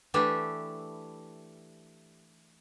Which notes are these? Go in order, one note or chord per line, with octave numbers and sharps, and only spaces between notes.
E3 A3 D4 E4 G4 E5